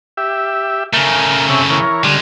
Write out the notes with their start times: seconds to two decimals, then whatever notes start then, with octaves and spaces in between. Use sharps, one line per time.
0.17 G4 E5
0.93 C#3 A3 A#4
1.50 C3 C#5 E5
1.70 E3 A#4 C#5
2.04 D3 G3 G#3 F4